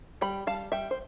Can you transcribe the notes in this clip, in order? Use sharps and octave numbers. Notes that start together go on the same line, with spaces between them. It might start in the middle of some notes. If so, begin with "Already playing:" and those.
G3 G5 B5
G3 F5 A5
G3 E5 G5
C5